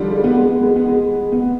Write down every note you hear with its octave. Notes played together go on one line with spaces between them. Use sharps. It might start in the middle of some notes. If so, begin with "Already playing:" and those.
Already playing: D3 D#3 F3 G3
G#3
B3
G#3
B3
G#3
B3
G#3
B3